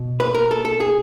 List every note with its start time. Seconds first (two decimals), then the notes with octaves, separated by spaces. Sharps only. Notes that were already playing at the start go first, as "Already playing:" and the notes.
Already playing: B2
0.20 B4
0.35 A#4
0.51 A4
0.65 A4
0.80 G#4